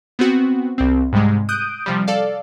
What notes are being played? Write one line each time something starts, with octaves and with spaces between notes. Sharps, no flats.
B3 C4 F#4
C2 C4
G#2 C3 G3 G#3
D#6 F#6 G6 D7 D#7
C3 F3 G3
A4 D5 F5